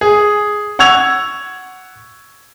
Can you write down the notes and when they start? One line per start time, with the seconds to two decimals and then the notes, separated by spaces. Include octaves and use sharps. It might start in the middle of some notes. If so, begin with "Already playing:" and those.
0.01 G#4
0.79 F#5 C#6 E6 G#6 F7